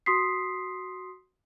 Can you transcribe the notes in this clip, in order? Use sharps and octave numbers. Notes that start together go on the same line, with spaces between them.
F#4 C6 D#6 B6 C7